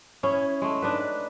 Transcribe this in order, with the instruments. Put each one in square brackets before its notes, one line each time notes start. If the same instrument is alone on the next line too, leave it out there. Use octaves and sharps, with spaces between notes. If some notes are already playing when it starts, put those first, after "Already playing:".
[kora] C#4 E4 G#4
G#3 A3
D4 D#4 B4